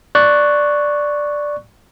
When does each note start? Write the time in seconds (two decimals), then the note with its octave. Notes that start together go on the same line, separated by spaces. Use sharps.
0.15 D5 C#6 F#6